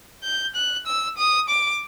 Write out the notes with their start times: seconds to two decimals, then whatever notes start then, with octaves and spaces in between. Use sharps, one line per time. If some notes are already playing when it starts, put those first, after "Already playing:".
0.24 G6
0.55 F#6
0.87 E6
1.18 D#6
1.49 D6